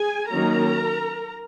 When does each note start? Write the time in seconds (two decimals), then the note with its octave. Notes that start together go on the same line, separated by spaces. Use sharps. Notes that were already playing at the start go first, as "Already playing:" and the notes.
Already playing: G#4 G#5
0.29 D#3 F#3 A#3 C#4 A#4 A#5